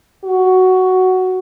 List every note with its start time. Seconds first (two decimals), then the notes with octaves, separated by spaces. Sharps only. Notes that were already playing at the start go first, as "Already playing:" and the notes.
0.24 F#4